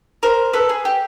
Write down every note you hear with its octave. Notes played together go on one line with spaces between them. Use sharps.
A#4 C5
A4 B4
G#4
G4